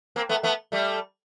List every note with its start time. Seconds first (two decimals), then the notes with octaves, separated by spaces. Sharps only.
0.16 A#3 C4
0.29 A3 B3
0.43 A3 B3
0.72 G3 A3